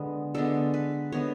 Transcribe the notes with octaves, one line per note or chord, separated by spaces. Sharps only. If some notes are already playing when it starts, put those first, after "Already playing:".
Already playing: D3 G#3 B3
D3 G#3 B3 A4
B4
D3 G#3 B3 C#5